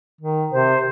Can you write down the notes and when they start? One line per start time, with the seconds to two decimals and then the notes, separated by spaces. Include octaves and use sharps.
0.21 D#3
0.51 C3 C5